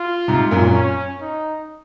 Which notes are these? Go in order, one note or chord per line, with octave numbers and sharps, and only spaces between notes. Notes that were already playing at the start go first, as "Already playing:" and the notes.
Already playing: F4
G#2 C3
F#2 A#2
C#4
D#4